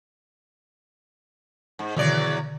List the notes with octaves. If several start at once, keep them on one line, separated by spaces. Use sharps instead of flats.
G#2
E2 B2 D3 D#3 F#3 D5